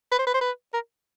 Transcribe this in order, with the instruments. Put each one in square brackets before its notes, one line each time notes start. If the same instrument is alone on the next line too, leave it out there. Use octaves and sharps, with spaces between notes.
[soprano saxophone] B4
C5
B4
C5
B4
A#4